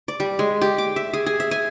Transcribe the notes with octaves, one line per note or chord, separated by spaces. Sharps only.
D5
G3
G#3
G4
D6
E5
G#4
G#4
E5
G#5